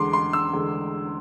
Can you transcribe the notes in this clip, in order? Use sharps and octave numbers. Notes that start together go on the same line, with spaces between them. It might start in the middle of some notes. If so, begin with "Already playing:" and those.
Already playing: E2 D3 G#3 C6 D6
C6
E6
E2 D3 G#3